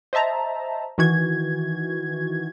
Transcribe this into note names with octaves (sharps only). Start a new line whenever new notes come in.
C5 D#5 E5 A5 A#5
D#3 E3 F#4 G#6